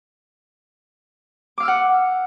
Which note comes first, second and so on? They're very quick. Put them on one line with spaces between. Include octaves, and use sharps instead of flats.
D6 F5 E6 F6 F#5